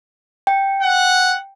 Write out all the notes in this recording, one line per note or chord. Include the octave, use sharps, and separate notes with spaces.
G5
F#5